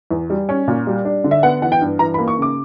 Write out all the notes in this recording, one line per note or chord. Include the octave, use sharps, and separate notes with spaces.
E2
G3
C#4
A#2
G3
D4
D3
E5
B3 F#5
E3 F#5
G5
G2
E3 A#5
B5
A#3
C#6
C#3 D6